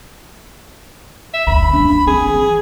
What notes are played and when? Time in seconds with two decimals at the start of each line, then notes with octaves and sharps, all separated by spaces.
1.34 E5
1.47 F#1 D2 B5
1.73 A#3 D4
2.07 C4 G#4
2.27 E3